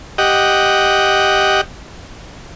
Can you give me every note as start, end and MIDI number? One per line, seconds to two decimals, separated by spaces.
0.18 1.61 67
0.18 1.61 75
0.18 1.61 78